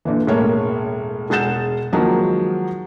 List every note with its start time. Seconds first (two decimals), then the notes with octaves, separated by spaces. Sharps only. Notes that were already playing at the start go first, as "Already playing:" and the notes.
0.05 A#2 D3 E3
0.27 E1 A2 A#3 C#5
1.30 E1 G#4 F#5 G6 A6 E7
1.92 D#3 F3 F#3 G#3 A#3